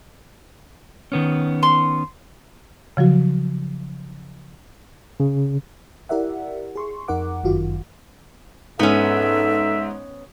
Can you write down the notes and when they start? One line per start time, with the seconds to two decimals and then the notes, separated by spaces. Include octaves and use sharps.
1.12 D#3 B3 C#4
1.63 C6
2.97 C#3 F3 F#3 F#4
5.20 C#3
6.09 E4 G4 A#4 D5 E5 F#5
6.75 G#4 C6 C#6
7.08 F2 D#4 A#4 F#5 D6
7.43 G1 F#2 D#3 F4 F#4
8.79 G#2 B3 C#4 A4 E5